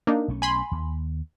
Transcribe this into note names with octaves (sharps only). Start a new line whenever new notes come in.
A#3 D4 D#4
B1 A3 C#4
G#5 B5 C6
D#2